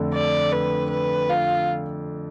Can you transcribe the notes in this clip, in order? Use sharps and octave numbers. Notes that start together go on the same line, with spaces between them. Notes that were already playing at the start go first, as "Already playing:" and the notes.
Already playing: F2 D3 A3 D4
D5
B4
B4
F4